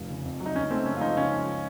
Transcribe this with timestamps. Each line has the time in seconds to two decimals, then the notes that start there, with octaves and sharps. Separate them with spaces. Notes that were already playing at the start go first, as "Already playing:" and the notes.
Already playing: F1 F3
0.09 C#3
0.24 F2
0.40 F#3
0.46 D#4
0.55 C#2 C#4
0.70 A3 C4
0.86 F#1 C#4
0.97 F4
1.01 F3 D#4
1.17 C#2 C#4
1.32 F3